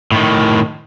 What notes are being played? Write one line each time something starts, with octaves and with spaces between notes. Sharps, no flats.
A2 D#3